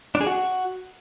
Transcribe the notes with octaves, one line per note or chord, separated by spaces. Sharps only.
D4
G#4
F#4